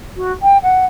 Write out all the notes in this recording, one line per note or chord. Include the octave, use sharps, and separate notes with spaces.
F#4
G5
F#5